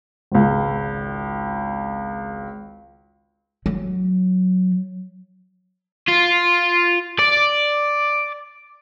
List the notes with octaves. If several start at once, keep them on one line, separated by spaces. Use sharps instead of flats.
G#1 C#2
F#3
F4
D5